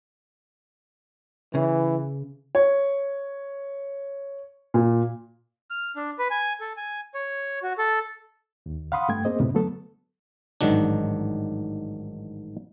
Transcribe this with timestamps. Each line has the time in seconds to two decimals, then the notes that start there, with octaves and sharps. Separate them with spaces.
1.55 C#3 E3
2.55 C#5
4.74 A#2
5.70 F6
5.96 D4
6.19 B4
6.30 G#5
6.60 A4
6.77 G#5
7.14 C#5
7.63 F#4
7.78 A4
8.66 D#2
8.92 F5 F#5 B5 C6 D#6
9.09 G2 A3 G5 G#6
9.25 A#3 C4 G#4 C5 D#5
9.40 F#2 A2 C3 B3 C#4
9.54 D3 F#3 A3 B3 A4
10.61 A1 G#2 D#3 F#3 D4